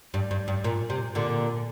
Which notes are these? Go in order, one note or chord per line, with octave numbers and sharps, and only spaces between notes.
G2
G2
G2
A#2
C3
A#2 D3